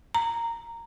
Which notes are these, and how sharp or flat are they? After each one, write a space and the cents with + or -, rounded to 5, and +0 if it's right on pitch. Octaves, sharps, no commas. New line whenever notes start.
A#5 -10